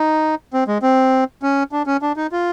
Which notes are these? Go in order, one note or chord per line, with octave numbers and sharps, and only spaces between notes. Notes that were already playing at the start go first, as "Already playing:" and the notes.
Already playing: D#4
C4
G#3
C4
C#4
D4
C#4
D4
D#4
F4